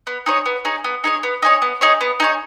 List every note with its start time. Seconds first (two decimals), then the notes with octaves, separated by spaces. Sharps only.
0.07 B3
0.26 D#4 G#4 C#5
0.46 B3
0.65 D#4 G#4 C#5
0.84 B3
1.04 D#4 G#4 C#5
1.23 B3
1.42 D#4 G#4 C#5
1.62 B3
1.81 D#4 G#4 C#5
2.01 B3
2.20 D#4 G#4 C#5